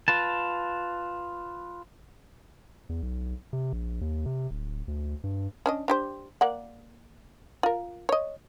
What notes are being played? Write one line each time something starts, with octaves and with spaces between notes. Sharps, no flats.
F4 B4 A5
E2
B1
C3
A#1
D#2
C3
D1
D2
G2
C#4 D4 D#5
D4 G4 C5
A#3 D5 F#5
F4 A#4
C#5 D#5